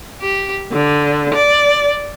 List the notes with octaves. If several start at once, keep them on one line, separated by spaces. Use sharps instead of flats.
G4
D3
D5